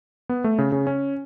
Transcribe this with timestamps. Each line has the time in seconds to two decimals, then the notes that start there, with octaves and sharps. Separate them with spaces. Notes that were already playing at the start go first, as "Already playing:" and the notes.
0.29 B3
0.44 A3
0.59 C#3
0.72 C#3
0.87 C#4